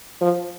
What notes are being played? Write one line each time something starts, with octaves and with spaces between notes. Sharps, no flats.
F3